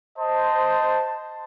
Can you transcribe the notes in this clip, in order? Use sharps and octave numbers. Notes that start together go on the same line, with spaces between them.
C5 D#5 A5